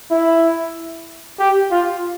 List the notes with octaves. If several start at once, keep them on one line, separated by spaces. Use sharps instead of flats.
E4
G4
F4